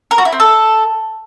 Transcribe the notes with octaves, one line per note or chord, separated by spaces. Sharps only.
A#4
F#4
E4
C4
A4